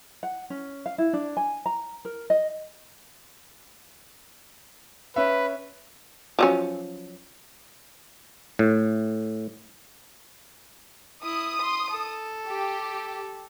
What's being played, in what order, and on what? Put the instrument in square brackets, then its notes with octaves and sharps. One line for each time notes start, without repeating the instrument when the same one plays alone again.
[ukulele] F#5
C#4
F5
E4
D4
G#5
A#5
A#4
D#5
[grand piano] C#4 E5 [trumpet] B4
[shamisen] F3 F#3 C#4
[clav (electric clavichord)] A2
[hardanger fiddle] E4 [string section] D#6
[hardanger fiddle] C6
A4
[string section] G4